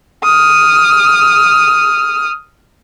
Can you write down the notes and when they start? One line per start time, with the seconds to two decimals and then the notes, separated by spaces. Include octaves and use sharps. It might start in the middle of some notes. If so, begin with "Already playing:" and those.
0.24 D#6 F6